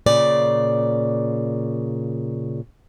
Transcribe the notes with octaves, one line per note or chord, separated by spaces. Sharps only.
A#2 C#3 D5